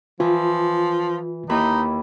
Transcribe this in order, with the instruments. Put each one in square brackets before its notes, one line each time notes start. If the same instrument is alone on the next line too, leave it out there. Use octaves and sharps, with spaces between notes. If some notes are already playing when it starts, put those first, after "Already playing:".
[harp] E3 [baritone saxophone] F3 [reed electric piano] F4
[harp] D#2 E4 B5 [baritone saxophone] D#4